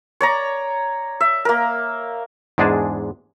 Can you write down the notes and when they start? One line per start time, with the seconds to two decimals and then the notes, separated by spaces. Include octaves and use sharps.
0.21 C#5 D5 A#5
1.20 E5
1.45 A#3 A#4
2.58 E2 G#2 G#3 D4 G#4 A5